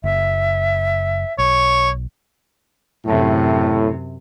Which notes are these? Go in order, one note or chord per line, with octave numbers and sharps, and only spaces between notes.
F#1 E5
B1 C#5
F#2 A2 C3